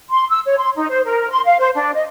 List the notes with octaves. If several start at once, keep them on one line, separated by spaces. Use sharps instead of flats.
C6
E6
C#5
C6
D#4
C5
A#4
C6
F5
C5
D4
D#5